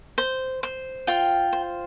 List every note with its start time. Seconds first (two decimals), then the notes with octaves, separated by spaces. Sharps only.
0.18 C5
0.63 C5
1.07 F4 G5
1.53 C5